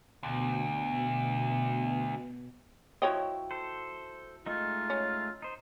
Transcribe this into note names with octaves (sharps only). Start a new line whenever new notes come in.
D2 B2
F3 E4 F#4 C#5 D#5 G5
A4 C5
G#3 A3 D#4 F4
C#4
D#4 C5